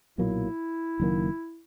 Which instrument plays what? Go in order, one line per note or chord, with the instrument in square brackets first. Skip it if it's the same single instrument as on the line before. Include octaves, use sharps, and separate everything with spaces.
[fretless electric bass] B1 A#2 F#3 A#3 [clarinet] E4
[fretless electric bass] F#1 F#2 D#3 A#3